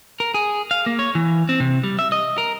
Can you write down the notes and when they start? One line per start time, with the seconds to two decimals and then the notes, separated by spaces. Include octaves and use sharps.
0.20 A#4
0.34 G#4
0.71 F5
0.86 A#3
0.99 C#5
1.15 E3
1.49 C4
1.60 C3
1.84 G3
1.99 E5
2.12 D#5
2.38 A#4